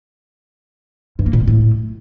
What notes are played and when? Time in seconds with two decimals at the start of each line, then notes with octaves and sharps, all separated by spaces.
1.19 G2
1.26 A#3
1.33 A#2
1.40 G#3
1.48 A2